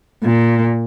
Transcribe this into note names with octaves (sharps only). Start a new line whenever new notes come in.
A#2